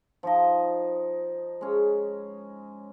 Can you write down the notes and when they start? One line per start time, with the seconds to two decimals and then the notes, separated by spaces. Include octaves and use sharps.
0.23 F3 D#4 D#5
1.61 G#3 C#4